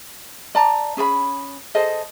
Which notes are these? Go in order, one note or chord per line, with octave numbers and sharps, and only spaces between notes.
D5 A5 A#5
C#4 G#4 D5 B5
G#4 A4 C5 D#5